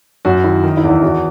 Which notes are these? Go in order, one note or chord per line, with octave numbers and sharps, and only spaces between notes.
F#2 F#4
D#3 E4
D#3 D#4
E4
E2
E4
E2 F#4